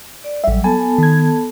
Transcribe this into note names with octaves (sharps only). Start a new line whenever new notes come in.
D5
A1 F#3 G3 E5
B3 A4 G#5 A5
D#3 G#6